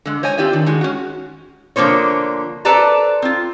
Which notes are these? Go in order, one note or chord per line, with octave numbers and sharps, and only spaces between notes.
D3 G#3
C5 C#5 D#5 G#5
C4 F4 G4 D5 E5
D#3 D4
D#3 G#3 F#4
C#4 F#4
D3 F3 A#3 C5 C#5
A4 B4 C5 D5 A5 A#5
C4 F4